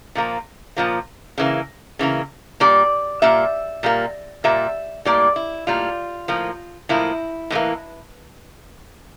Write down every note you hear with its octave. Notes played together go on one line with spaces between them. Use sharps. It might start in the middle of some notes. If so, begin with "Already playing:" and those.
A#2 F3 A#3
A#2 F3 A#3
C#3 E3 A#3
C#3 E3 A#3
A#2 G3 A#3 D5
A#2 G3 A#3 E5
A#2 G3 A#3
A#2 G3 A#3 E5
A2 G3 A#3 D5
E4
A2 G3 A#3 F4
A2 F3 A#3
A2 F3 A#3 E4
A2 E3 G3 A#3